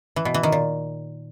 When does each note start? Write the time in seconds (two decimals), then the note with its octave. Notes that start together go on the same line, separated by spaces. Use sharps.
0.16 E3
0.25 B2
0.34 E3
0.43 D#3
0.52 A#2